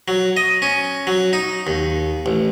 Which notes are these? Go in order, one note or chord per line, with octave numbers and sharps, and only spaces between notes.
F#3
D#5
C#4
F#3
D#4
D#2
A1